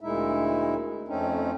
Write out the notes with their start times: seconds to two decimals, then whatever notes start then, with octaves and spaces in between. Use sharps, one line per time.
0.01 D2 A#2 G#3 D#4 E4 E5
1.08 F2 A3 C4 C#4 D#4